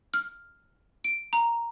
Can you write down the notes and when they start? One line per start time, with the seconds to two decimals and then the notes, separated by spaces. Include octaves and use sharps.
0.14 F6
1.04 D7
1.33 A#5